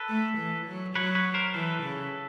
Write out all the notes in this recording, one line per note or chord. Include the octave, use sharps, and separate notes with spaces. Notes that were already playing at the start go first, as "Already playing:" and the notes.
Already playing: A4 B4
A3
E3
F#3
F#3 B4 C#5
B4 C#5
A#4 C5
E3 A4 B4
C#3